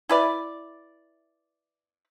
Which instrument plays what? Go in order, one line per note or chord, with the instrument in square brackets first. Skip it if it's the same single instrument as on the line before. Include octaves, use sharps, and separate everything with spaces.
[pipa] E4 B4 D5